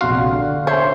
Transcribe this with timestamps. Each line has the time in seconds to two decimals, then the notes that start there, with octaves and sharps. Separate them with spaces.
0.01 A#1 C3 F#4 F5 C6
0.24 D3 D4
0.67 C5 C#5 E5